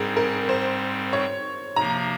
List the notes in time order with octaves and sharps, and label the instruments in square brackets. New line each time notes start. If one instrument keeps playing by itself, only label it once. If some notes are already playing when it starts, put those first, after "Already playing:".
Already playing: [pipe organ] G#2 G3 C4 [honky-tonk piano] G#4 A#4
[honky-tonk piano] A#4
C5
C#5
[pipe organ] C3 F3 A#3 [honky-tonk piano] A#5